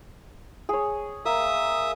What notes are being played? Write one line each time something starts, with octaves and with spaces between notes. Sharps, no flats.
G#4 C#5
A#3 E5 D#6